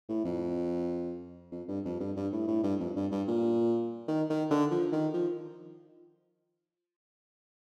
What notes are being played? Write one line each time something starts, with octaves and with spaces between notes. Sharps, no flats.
A2
F2
F2
G2
F2
G2
G2
A2
A2
G2
F2
G2
G2
A#2
D#3
D#3
D3
F3
D#3
F3